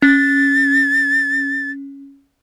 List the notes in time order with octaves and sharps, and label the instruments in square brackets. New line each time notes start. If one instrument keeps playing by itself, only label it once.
[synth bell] C#4 [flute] A6